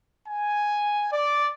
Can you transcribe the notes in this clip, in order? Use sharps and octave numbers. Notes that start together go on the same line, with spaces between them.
G#5
D5